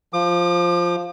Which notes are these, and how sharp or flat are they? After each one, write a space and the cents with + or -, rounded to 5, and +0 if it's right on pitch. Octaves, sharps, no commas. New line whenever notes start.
F3 +0 D6 +40